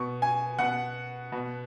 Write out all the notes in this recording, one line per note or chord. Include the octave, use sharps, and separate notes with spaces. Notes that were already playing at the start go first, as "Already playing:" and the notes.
Already playing: B2 C#6
G#5
B2 F#5
B2